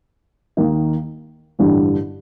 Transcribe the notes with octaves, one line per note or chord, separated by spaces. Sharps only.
D#2 D#3 A#3 D#4
A1 G2 D3 G3